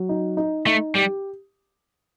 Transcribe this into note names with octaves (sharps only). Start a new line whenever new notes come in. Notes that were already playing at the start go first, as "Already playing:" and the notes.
Already playing: F#3
D#4
D#4
A3 D#4
G3 G4